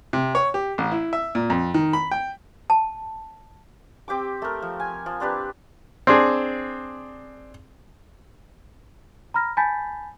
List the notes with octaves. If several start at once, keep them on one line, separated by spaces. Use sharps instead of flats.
C3
C#5
G4
A1
E4
E5
A#2
F2
D#3
B5
G5
A5
C4 G4 G5 D6
A3 A#4
F3
G#5
F3
C4 D4 G4 B4
C4 D4 G#4
A#5 B5 F6 A#6
G#5 A5 B5 G6 A6 B6